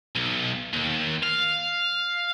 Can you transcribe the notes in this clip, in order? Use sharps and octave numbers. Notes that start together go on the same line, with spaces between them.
B1
D#2
F5